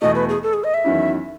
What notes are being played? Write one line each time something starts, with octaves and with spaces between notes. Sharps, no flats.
E2 B2 A3 D#5
B4
G#4
A4
G#4
D#5
E5
E2 D#3 F#3 C#4 E4